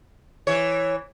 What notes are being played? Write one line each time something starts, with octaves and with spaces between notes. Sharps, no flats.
E3 C#5